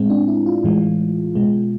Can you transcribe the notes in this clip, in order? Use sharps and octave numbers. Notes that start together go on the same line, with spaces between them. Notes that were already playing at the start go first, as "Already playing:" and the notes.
Already playing: A2 G#3 C4
D4
E4
F4
A2 E3 G#3
B2 G#3